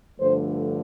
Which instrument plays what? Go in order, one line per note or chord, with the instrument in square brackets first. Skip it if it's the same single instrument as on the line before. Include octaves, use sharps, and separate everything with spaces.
[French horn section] G2 D3 F3 A3 C5